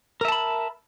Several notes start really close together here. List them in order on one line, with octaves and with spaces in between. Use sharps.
A#4 E5 A5 B5